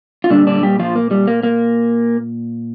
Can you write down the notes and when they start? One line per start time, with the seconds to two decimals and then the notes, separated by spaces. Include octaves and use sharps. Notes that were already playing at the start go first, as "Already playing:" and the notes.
0.24 F4
0.30 A#2 D3 G3 D4
0.47 D3 D4
0.63 G3 G4
0.79 F3 F4
0.95 A#3
1.11 G3
1.28 A#3
1.43 A#3